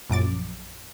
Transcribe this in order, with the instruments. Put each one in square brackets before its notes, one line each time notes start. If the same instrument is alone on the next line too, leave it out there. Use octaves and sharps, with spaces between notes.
[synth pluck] A#1 F#2 D6 A6